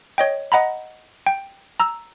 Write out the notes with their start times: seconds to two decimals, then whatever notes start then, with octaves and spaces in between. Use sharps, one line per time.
0.18 C#5 D#5 G5
0.52 D#5 F#5 A#5 B5
1.27 G5
1.80 A#5 E6